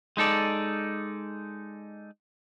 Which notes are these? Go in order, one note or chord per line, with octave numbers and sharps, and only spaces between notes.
G#3 D#4 A4 D5